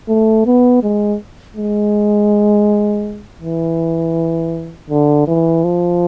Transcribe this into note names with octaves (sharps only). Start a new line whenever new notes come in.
A3
B3
G#3
G#3
E3
D3
E3
F3